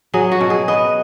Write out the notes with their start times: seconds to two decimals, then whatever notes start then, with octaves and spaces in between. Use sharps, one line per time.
0.14 F#3 G#4
0.32 F#4
0.41 B2
0.50 G#4
0.68 B3 D#5